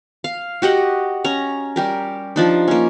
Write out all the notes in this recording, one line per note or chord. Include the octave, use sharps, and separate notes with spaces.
F5
F#4 G4 D#5 F#5
C#4 A#5
G3 G4 A#4
F3 D4 D#4
A#3 C#4